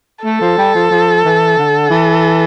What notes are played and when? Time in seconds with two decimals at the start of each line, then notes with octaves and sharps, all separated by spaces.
0.24 A3 A4
0.41 F3
0.58 G3
0.75 F3
0.91 F3
1.25 E3
1.58 D3
1.90 E3